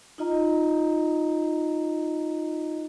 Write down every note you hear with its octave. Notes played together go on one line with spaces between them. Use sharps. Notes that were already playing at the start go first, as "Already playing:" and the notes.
D#4 F4 D#5 A#5